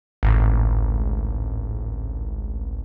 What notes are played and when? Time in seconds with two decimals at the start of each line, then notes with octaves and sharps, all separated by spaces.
0.23 G#1 C#2 A2